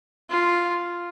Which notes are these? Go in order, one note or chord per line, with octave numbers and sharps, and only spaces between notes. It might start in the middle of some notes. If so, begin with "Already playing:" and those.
F4